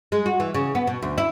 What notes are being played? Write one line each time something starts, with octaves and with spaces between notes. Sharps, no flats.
G#3
F#4
E3
C#3
B3
B2
D2
E4